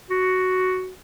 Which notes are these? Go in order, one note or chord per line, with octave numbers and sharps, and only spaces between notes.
F#4